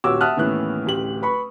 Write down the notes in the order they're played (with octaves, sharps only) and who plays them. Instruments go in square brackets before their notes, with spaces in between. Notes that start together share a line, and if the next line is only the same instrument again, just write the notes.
[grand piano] D#1 F#4 G4 C#5 D6 E6
E5 F#5 A5 D#6 F6 F#6
D#2 A2 E3 B3 C#4 F#6
D1 A1 G4 F#7
B4 B5 C#6